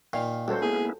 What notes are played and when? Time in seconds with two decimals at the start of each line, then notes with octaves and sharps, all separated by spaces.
0.13 A#2 D#3 F5
0.48 C#2 G3 F#4 A4 C5
0.62 A#3 B3 E4 G#4